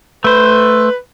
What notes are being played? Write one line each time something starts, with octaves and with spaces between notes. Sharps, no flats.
A3 B4 C5